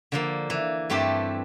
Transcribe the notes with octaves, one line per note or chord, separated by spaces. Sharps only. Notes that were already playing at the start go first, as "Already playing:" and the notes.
D3 F3 A#3
E3
G2 A3 C4 G4